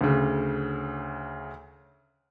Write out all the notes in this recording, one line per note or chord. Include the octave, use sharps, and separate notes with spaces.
D2 C#3